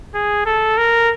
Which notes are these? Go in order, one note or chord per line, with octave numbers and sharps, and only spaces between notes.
G#4
A4
A#4